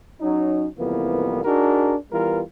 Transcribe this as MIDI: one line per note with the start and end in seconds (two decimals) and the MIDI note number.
0.21 0.67 54
0.21 0.67 61
0.21 0.67 63
0.78 1.42 36
0.78 1.42 41
0.78 1.42 52
0.78 1.42 58
0.78 1.42 59
1.45 1.95 62
1.45 1.95 63
1.45 1.95 66
1.45 1.95 68
1.45 1.95 70
2.12 2.41 52
2.12 2.41 55
2.12 2.41 59
2.12 2.41 65
2.12 2.41 70